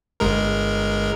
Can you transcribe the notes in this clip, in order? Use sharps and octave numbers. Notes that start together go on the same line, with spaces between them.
G1 G#3 A#4